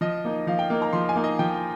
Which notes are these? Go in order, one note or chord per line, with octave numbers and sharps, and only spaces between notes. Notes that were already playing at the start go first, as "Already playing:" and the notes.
F3 D#5
A#3 D#4
F3 F5
G5
A#3 D#4
A#5
F3 C6
G#5
A#3 D#4
D#5
F3 G5